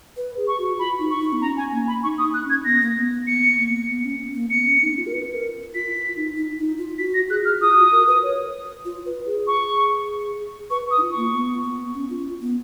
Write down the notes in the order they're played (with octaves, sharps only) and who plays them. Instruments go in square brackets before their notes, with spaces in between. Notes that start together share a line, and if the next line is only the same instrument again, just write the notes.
[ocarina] B4
G#4
[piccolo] C#6
[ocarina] F#4
[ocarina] F4 [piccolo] B5
[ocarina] D#4
[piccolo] C#6
[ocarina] D#4
B3
[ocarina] C#4 [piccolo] A#5
[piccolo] G#5
[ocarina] A#3 [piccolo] G#5
[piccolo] B5
[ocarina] D#4 [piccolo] C#6
[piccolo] D#6
[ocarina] D#4
[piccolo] F#6
[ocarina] C#4
[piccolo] G#6
[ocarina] B3 [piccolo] A#6
[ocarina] A#3
B3
B3
[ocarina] B3 [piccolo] C#7
[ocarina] A#3
B3
C#4
A#3
[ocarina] B3 [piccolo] C#7
[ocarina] C#4
D#4
F4
A#4
B4
A#4
[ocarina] F4 [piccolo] B6
[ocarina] F4
D#4
D#4
D#4
F4
[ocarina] F#4 [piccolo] B6
[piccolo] A#6
[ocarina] G#4 [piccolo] F#6
[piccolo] F6
[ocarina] F4 [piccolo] D#6
[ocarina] F#4
A#4
B4
C#5
F4
B4
G#4
[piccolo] C#6
[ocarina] B4 [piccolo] C#6
[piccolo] D#6
[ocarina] D#4
F4
[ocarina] A#3 [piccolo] C#6
[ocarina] B3
B3
C#4
F4
B3